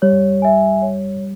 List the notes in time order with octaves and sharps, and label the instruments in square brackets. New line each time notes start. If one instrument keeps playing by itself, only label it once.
[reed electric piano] G3 [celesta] C#5
[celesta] E5 G#5
C#5